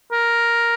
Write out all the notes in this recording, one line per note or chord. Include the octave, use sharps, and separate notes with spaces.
A#4